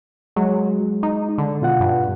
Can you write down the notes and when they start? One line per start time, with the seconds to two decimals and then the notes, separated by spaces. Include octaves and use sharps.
0.36 F#3 G#3
1.03 D#4
1.38 D3
1.62 B2 F4 F#5
1.80 G2